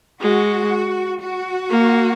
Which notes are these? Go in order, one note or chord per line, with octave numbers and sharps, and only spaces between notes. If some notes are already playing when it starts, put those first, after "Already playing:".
G#3 F#4
F#4
A#3